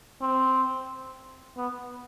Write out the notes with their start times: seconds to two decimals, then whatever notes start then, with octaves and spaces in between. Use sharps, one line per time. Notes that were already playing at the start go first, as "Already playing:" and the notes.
0.22 C4
1.57 B3